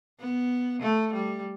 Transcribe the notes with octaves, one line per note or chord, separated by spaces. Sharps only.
B3
A3
G3